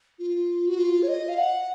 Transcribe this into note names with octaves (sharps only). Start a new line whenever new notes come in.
F4
F#4
F4
C#5
D#5
F5
F#5